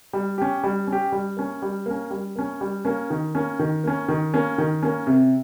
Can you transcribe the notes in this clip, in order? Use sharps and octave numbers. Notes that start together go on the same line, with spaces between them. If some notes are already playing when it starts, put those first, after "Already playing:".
G3
C#4 G4
G3
C#4
G4
G3
A#3 C#4
G3
A#3 C#4
G3
A#3 C#4
G3
A#3 C#4
D#3
A#3 C#4
D#3
A#3 C#4
D#3
A#3 C#4
D#3
A#3 C#4
C3